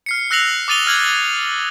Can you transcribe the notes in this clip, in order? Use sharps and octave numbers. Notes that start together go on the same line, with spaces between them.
F6 C7 C#7
E6 F#6 A#6 C7 F7 F#7
D6 D#6 A6 D#7 F7 G7
F6 G#6 F#7